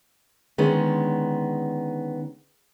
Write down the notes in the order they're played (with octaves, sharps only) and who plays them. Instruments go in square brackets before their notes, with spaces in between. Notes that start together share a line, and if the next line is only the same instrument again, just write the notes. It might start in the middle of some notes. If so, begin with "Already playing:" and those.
[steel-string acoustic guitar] D3 D#3 G#3 B3 C#4